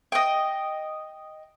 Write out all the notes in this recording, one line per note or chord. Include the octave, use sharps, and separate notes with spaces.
D#5 G5